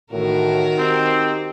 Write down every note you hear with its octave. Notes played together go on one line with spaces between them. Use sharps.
A1 A2 D#3 F#4 A#4
C4 D#4 G4